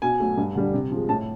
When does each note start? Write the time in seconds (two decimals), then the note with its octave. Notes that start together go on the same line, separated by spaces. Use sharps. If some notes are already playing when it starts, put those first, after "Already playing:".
0.02 B2 G#5
0.20 F#3 A3
0.37 G2
0.55 D3 G3
0.73 C3
0.91 F3 G#3
1.09 A2 A5